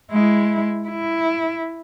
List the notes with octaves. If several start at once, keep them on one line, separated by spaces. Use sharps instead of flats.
G#3 E4
E4